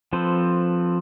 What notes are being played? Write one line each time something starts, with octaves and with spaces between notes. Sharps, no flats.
F3 C4 A4 B4 C5